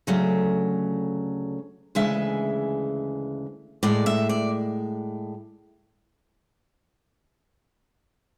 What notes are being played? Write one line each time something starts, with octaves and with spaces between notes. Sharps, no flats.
D2 C#3 F#3 A3
D2 C#3 E3 G#3 E5
A2 G#3 D5
E5
D5